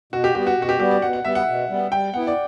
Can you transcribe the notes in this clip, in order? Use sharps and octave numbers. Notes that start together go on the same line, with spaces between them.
B2 F#4
G4
G3 B3 G4
F#4
B2 F#4
G4
G3 B3 G4
D5
B2 F#5
F#5
G3 B3 E5
F#5
B2
G3 B3
G3 G5
B3 E4 F#5
D5